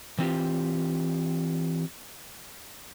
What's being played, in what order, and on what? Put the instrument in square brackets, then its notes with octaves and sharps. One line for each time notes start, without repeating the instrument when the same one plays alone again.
[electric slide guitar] E3 C4 F4 G4